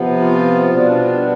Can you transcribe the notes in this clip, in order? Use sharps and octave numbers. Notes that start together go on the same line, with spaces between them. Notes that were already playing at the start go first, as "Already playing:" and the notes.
Already playing: C3 F3 B3
F4
B2 G3 B3 D4